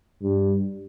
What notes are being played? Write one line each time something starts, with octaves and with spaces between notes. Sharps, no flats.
G2